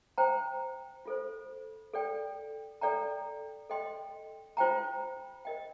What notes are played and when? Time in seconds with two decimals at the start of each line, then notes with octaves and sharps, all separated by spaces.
0.18 C5 G5 A#5
1.06 F4 A4 C5
1.94 A4 D5 G5
2.81 A4 D5 G5 A#5
3.70 A4 D#5 G5 C6
4.57 F4 C5 G5 A#5
5.45 A#4 D#5 G5